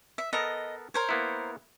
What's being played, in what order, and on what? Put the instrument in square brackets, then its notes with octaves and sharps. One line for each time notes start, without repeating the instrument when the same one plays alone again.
[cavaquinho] E5
[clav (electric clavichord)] B3 A4 A#4 [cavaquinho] D#5
[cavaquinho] A#4 C5 C#5
[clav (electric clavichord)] A#3 B3 E4